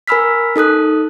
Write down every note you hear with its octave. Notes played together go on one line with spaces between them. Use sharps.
A#4 G#5 B5 E6 F6 B6
D#4 A4 D#6 F#6